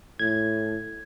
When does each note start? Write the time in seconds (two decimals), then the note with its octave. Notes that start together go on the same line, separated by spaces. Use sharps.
0.19 A2 G#6